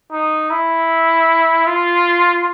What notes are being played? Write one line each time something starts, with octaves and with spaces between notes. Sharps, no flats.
D#4
E4
F4